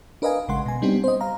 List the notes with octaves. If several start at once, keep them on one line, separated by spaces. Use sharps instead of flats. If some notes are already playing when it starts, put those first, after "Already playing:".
D4 A#4 B4 D#5 F5 G#5
A1 C#3 G#3 F#5 C6
B2 G#5
G3 B3 C4 D4 D#4 G4
C5 D#5
F5 A#5